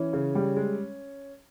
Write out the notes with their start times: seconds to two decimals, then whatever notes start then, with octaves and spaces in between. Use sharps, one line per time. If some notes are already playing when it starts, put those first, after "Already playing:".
Already playing: E3 C#4
0.13 C#3
0.35 G3
0.57 G#3